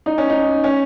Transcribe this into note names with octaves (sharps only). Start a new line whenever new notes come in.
D#4
C#4
D#4
C#4